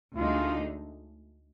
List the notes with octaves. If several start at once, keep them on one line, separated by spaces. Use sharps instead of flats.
D2 D3 G#3 D#4 F4